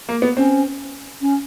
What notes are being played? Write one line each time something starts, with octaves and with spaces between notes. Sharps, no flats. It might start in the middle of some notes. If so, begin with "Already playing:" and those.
A#3
B3
C4 C#4
C#4